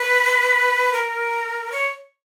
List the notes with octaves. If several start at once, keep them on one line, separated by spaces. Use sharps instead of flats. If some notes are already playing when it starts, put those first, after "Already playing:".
Already playing: B4
A#4
C#5